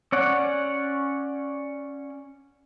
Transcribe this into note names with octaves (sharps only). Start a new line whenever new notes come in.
C#4 C#5 D5 F#5